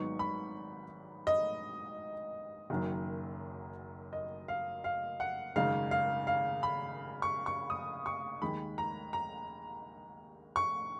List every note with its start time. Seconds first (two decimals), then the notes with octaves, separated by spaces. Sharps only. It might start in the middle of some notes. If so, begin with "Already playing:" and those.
Already playing: G#1 G#2 F#3 B3 D#4 C#6
0.19 B5
1.27 D#5
2.70 F#1 F#2 D#3 F#3
4.13 D#5
4.48 F5
4.84 F5
5.20 F#5
5.56 G#1 F#2 C#3 G#3 D#4 F5
5.91 F5
6.27 F5
6.63 B5
7.22 C#6
7.46 C#6
7.70 D#6
8.06 C#6
8.42 D#2 D#3 G#3 B5
8.78 A#5
9.13 A#5
10.56 C#6